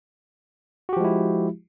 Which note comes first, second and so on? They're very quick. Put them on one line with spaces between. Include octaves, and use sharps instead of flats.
F#4 G4 F3 G#3 E4